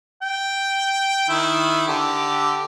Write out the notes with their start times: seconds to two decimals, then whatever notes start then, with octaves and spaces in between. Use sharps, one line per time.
0.22 G5
1.29 D#3 E4
1.88 D3 G4